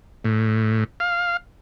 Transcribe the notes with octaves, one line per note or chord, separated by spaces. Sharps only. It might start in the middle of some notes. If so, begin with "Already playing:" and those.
A2
F5